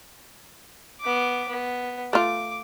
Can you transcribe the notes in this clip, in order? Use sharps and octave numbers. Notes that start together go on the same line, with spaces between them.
B3 D6
B3
A3 F4 D6